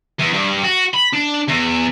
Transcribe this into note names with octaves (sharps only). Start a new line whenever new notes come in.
E2
G2
F#4
B5
D4
E2